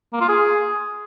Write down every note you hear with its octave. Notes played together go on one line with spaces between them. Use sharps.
A#3
F4
G#4